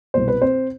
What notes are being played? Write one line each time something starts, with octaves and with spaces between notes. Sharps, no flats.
C2 B2 C5
B4
C4 C5